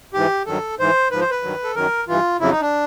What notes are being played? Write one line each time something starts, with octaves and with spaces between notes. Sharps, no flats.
G#2 E3 G4
G2 D#3 F#3 A4
G#2 E3 C5
G#2 F3 B4
C5
B4
G2 D#3 F#3
A4
F#2 D#3 F#3 A#4
G2 E3 F4
F2 C#3 F#3 E4
D#4
D4